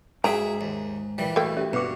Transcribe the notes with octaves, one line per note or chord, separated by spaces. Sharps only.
G#2 F#4 G#4 E5 G5 G#5 A#5
D#2
A#2 E3 G3
A3 A#3 F#4 G5
C#4 G4 E5
G2 B2 F#4 B4 D6